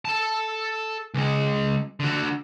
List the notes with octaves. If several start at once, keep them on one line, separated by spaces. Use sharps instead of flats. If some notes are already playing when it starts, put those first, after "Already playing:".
A4 A5
C#2 G#3
D3 F#4